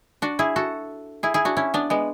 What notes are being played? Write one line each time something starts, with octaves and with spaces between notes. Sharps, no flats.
D4 F#4
E4 G#4
F#4 A4
E4 G#4
E4 G#4
D4 F#4
C#4 E4
B3 D4
G#3 B3